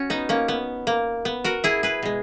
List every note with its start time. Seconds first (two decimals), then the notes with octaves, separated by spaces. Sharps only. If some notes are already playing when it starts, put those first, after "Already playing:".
Already playing: C#4 F#4
0.10 B3 D#4
0.29 A#3 C#4
0.48 B3
0.87 A#3
1.25 B3
1.44 F#4 A#4
1.64 E4 G#4
1.83 G#4 B4
2.03 B2 G#3